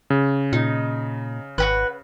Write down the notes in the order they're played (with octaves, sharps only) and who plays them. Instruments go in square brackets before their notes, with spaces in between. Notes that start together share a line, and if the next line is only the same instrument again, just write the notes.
[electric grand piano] C#3
[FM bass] A#2 [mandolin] D#4
[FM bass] G#1 [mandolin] F#4 G4 B4